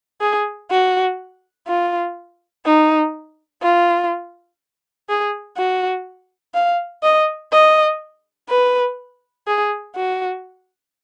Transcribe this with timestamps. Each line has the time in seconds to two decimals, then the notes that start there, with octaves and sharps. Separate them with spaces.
0.21 G#4
0.71 F#4
1.67 F4
2.65 D#4
3.62 F4
5.09 G#4
5.57 F#4
6.54 F5
7.03 D#5
7.52 D#5
8.49 B4
9.47 G#4
9.96 F#4